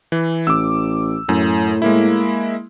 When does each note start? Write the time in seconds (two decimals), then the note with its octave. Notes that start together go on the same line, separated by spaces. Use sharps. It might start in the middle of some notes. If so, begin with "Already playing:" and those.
0.12 E3
0.47 A1 D6 E6
1.29 F#2 A2
1.82 G#3 A#3 E4